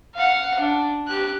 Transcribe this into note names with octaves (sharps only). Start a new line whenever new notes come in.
F5 F#5
D4
G4 F#6